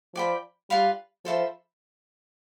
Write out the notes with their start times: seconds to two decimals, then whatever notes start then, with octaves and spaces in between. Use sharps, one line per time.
0.15 F3 D5 G5 B5
0.70 G3 F4 B4 F5 B5
1.25 F3 A4 C5 E5 B5